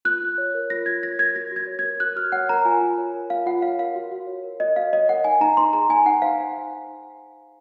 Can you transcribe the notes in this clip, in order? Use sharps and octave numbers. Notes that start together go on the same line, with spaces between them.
F4 F#6
F4
C#5
A#4
F4 A#6
F4 G#6
C#5 A#6
A#4 G#6
F#4 A#6
F#4 G#6
C#5
A#4 G#6
F#4 F#6
F#4 F6
C#5 F#5
A#4 A#5
F4 G#5
F4
C#5
A#4
F4 F5
F4 F#5
C#5 F5
A#4 F5
F#4
F#4
C#5
A#4
F#4 D#5
F#4 F5
C#5 D#5
A#4 F#5
D#4 G#5
D#4 A#5
C5 C6
G#4 A#5
D#4 G#5
D#4 F#5
C5 F5